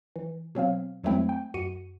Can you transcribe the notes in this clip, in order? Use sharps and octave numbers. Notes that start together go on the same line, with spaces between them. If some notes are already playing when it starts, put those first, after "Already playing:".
E3
B2 F#3 C4 F5
F2 F#3 G#3 A3 C4 E4
G5
F#2 F#4 C#7 D#7